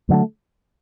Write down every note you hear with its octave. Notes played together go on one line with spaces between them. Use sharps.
G2 D3 F#3 A3